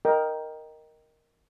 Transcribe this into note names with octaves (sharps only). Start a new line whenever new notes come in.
A#4 D#5 G5